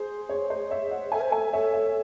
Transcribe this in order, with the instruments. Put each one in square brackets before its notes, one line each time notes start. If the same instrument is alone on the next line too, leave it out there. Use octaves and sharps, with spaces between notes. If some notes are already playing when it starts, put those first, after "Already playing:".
Already playing: [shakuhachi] G#4 [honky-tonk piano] C5
[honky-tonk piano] C#5
C5 D#5
C#5 E5
D#5 F#5
[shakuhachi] A4 [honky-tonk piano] E5 G#5
[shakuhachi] C5
[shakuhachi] A4 [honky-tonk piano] E5 G#5
[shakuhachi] A4 [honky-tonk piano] C#5 E5
[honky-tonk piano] C#5 E5